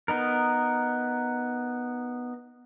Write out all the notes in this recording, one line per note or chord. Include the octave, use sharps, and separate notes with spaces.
B3 D#4 A#4